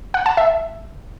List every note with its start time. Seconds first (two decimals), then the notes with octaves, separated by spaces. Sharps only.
0.14 F#5
0.26 A5
0.37 E5